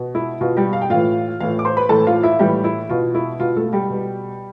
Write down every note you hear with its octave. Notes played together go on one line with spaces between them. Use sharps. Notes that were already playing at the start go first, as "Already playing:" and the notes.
Already playing: B2
E4
B2 F4
G3 G4
F5
G5
A2 E3 F4 F5
A2 E3 F4 F5
D6
C5 C6
B4 B5
A2 E3 A4 A5
F4 F5
E4 E5
A2 E3 G3 G4
E4
B2 F4
E4
B2 F4
A3 A4
G3 G4
B2